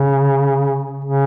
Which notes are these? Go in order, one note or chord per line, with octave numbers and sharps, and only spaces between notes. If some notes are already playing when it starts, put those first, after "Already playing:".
Already playing: C#3
C#3